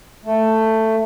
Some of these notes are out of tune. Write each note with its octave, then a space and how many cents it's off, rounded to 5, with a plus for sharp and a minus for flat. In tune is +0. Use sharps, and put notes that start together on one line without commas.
A3 +10